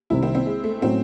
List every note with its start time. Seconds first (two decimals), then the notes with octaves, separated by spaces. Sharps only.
0.10 C2 C3 D#3 E4
0.23 C4
0.35 C4
0.46 G#3
0.64 A3
0.81 A2 F#3 C4 C#4